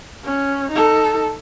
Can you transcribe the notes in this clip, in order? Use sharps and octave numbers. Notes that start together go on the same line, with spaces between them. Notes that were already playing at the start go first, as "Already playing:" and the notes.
C#4
D#4 A4